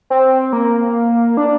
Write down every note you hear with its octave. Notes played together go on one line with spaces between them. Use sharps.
C4
A#3
D4